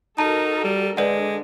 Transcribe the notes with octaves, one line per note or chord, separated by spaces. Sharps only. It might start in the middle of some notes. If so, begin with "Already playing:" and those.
D#4 F#4 A4 A#4 A5 A#5
G3
D3 G#3 B4 D5 F#5